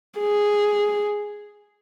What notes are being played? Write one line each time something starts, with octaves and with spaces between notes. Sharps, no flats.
G#4